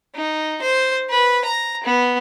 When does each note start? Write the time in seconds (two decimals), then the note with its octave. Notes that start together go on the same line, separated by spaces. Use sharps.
0.15 D#4
0.62 C5
1.10 B4
1.45 A#5
1.84 B3